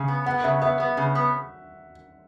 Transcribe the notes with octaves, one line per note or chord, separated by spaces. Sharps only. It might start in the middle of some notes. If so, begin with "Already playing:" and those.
Already playing: C#3
B3
B3 F#5
C#3 E5
B3 E5
B3
C#3
B3